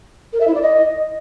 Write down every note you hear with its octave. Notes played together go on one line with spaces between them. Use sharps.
A#4
E5
E4
D5
D#5